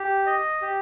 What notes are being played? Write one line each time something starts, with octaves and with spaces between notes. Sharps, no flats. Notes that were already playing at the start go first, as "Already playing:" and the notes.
Already playing: G4
D#5
G4